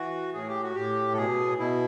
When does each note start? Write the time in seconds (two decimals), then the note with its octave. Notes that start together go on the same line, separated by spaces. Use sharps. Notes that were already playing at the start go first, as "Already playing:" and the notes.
Already playing: E3 F#4
0.34 A2 G#4
0.48 G4
0.62 F#4
0.75 A2 G4
1.13 A4
1.17 B2 G#4
1.58 B2 E4